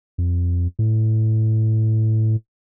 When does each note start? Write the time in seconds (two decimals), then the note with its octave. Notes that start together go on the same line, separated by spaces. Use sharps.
0.18 F2
0.79 A2